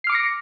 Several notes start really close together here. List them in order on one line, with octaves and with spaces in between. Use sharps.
C7 F6 D6 C#7 A#6